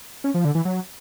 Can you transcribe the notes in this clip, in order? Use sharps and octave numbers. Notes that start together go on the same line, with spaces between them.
C#4
F3
D3
E3
F#3